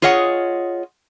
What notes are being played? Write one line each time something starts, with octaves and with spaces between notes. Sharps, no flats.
F4 G#4 C#5 D#5 F#5